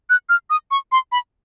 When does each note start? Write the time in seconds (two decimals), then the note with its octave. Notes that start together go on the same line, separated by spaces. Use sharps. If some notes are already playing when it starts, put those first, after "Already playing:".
0.10 F#6
0.29 F6
0.50 D#6
0.71 C#6
0.92 C6
1.12 B5